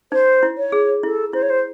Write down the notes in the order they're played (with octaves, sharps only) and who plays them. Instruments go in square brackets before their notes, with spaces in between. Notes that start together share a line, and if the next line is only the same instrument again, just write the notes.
[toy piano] D#4 [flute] C5
[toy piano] E4
[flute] C#5
[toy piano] G#4
[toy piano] E4 [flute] A4
[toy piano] E4 [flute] C5
[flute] C#5
C5